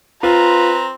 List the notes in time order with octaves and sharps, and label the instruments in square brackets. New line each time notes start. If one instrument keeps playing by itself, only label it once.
[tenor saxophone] C4 [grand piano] F4 [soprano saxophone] B4 [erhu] A#5